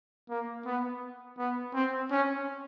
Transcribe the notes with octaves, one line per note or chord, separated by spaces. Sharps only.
A#3
B3
B3
C4
C#4